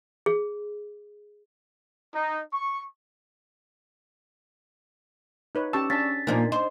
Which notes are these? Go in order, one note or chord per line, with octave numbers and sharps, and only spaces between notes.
G#4
D#4
C#6
D#4 B4 C#5
C#4 G4 A5 C#6 E6
C#4 D4 A5 A6 B6
A#2 F3 A#3 D4 D#4 G#5
C5 D#5 C6